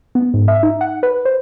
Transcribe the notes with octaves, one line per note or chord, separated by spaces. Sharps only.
B3
G#2
E5
D#4
F#5
B4
C5